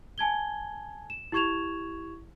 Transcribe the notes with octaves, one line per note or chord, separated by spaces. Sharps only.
G#5 A5 G#6 G7
E7
E4 G4 C#6 G#6 E7 F7